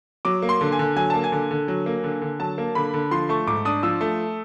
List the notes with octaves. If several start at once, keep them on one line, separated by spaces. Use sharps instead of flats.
F#3 D6
A#3
C6
D3
G#5
D3
F#3 G#5
A#3 A5
G#5
D3
D3
F#3
A#3
D3
D3
F#3 A5
A#3
D3 B5
D3
F3 C6
A3 C#6
G#2 D6
D4 D#6
F3 E6
A3